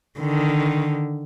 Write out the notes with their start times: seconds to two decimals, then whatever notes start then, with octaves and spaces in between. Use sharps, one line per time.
0.20 D3 D#3